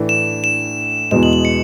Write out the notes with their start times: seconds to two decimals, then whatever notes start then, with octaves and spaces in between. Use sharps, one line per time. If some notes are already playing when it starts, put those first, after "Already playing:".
Already playing: A2 E3 A3 D4
0.09 E7
0.44 E7
1.11 E2 B2 G#3 E7
1.23 F#7
1.33 F#7
1.45 C#7